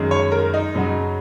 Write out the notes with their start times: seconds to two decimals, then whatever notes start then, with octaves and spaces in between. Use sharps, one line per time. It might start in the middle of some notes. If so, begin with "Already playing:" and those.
Already playing: F#2 D#3 G#3
0.11 C#5
0.32 A#4
0.54 D#4
0.74 F#2 C#3 F#3